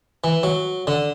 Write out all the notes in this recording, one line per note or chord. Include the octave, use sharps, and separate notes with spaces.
E3
F#3
D3